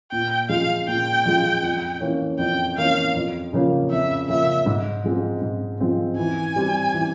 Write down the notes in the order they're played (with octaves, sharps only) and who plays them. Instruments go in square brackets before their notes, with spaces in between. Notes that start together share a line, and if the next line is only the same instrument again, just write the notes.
[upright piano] A#2 [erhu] G5
[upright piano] F3 G#3 [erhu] F5
[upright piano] A#2 [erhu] G5
[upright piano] F3 G#3
F2
E3 A#3 C#4
[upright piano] F2 [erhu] G5
[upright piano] E3 A#3 C#4 [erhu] F5
[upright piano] F2
C#3 F3 A#3 C#4
[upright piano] F2 [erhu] E5
[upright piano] C#3 F3 A#3 C#4 [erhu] E5
[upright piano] G#2
F3 G#3 C4
G#2
F3 G#3 C4
[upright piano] E3 [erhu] G#5
[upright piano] G3 C4
E3